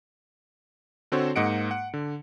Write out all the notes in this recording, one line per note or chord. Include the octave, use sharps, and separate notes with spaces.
D3 C4 F#4 A4 C5 C#5
G#2 A#3 D#5 F#5 C#7 D7
F#5
D3